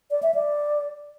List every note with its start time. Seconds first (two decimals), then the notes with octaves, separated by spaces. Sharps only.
0.11 D5
0.23 E5
0.34 D5